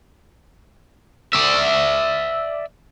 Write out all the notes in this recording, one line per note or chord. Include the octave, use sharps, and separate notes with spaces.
D5 E5